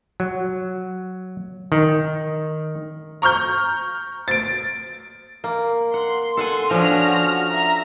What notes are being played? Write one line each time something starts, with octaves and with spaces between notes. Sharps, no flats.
F#3
D#3
A#5 C#6 F6 G6
A6 D7
A#3
F#5 C6
A4 F#5 G#5
F3 C#4 D4 F#4 F6 A#6
E5 A#5